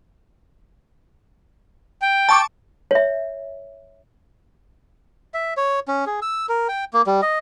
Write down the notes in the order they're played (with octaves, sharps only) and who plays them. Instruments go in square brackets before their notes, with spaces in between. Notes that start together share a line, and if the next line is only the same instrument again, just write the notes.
[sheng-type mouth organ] G5
[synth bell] A5 C#6 D6
[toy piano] C#5 E5
[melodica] E5
C#5
C#4
G#4
E6
A#4
G5
A#3
G3
D#5